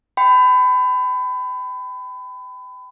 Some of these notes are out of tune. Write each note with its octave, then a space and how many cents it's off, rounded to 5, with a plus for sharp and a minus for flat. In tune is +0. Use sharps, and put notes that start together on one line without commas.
G5 +0 B5 +30